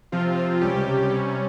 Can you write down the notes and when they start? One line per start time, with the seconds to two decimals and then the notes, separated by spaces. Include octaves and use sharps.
0.12 C3 F3 C4 F4
0.61 C#2 C3 G3 C#4 G4
1.10 C3 G3 C#4